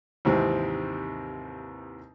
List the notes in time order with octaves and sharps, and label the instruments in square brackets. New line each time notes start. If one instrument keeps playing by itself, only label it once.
[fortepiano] D#2 G#2 C3 E3 C4